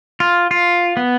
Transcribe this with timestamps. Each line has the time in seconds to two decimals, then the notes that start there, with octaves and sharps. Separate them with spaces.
0.20 F4
0.51 F4
0.97 B3